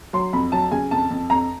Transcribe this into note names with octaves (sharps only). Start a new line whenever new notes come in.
F#3 C6
F2 B5
F#3 A5
C#3 G#5
F2 A5
F2
F2 A#5